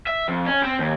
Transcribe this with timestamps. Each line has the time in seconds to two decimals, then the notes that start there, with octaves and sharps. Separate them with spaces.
0.07 E5
0.29 F2
0.48 C#4
0.64 C4
0.80 D#2